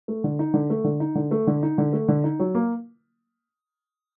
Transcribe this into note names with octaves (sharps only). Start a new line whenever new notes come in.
A3
D3
D#4
D3
A3
D3
D#4
D3
A3
D3
D#4
D3
A3
D3
D#4
F#3
A#3